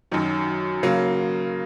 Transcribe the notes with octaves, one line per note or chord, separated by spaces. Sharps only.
F#2 D#3 F#3
C#3 F#3 A#3